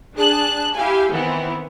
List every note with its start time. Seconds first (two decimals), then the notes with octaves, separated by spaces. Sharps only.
0.15 D4 G#4 A5 F#6
0.75 E4 G4 F5 G#5
1.11 D#3 E3 B3 C4 E4